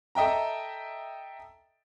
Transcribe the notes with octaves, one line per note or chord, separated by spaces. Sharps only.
A4 D#5 E5 G5 A#5